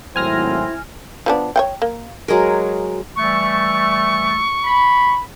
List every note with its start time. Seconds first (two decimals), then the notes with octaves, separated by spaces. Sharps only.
0.16 G#1 A2 F#3 C4 E4 G#5 F6 A#6
1.26 F3 B3 D4
1.56 C#5 F#5 G5
1.82 A#3
2.28 F#3 G#3 G#4 A#4
3.16 E3 G3 A3 C#6
4.64 B5